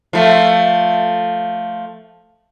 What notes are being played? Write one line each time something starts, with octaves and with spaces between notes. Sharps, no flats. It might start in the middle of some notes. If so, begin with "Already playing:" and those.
F3 A3